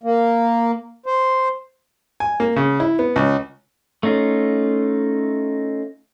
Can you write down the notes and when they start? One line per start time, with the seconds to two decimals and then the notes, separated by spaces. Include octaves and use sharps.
0.04 A#3
1.06 C5
2.20 G#5
2.40 A#3
2.56 C#3
2.80 E4
2.99 B3
3.16 C#2
4.03 A3 C#4 D#4 F4